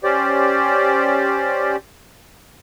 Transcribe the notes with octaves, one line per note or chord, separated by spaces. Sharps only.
C#4 G4 C5 D5